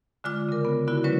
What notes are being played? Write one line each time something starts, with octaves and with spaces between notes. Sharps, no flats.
D3 G#3 F4 D6 F6
C#3 A#4
B3
D3 B3 E4 F#4
D3 F#3 G#3 C#4 B4 C#5